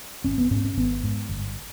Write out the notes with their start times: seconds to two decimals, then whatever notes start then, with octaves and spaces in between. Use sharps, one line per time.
0.24 G#1 C#4
0.38 B3
0.51 G#2 C#4
0.65 C#4
0.77 G#1 B3
1.04 G#2
1.29 G1